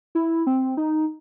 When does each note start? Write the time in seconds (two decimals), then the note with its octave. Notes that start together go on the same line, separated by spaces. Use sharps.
0.15 E4
0.47 C4
0.77 D#4